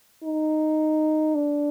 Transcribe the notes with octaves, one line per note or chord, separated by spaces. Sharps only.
D#4
D4